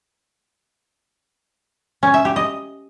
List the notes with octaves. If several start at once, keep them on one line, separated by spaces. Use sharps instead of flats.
C#4
E5
G4
D#5